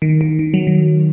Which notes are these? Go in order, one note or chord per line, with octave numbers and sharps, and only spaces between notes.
D#3
D#3
D#3
F#3
D#3